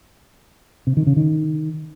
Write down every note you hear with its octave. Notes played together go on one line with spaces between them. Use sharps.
C3
D#3
C#3
D#3